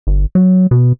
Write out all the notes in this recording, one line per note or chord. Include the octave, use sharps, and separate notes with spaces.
G1
F#3
B2